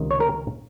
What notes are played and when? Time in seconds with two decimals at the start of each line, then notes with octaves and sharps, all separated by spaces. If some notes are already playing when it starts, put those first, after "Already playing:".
Already playing: C#2 C3 D#3
0.11 C#5
0.20 A#4